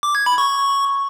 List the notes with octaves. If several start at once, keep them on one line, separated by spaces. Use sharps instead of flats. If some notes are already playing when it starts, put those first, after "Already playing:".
D6
G#6
B5
C#6